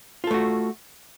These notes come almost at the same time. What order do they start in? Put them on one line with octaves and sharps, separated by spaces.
F4 A4 A3 F#4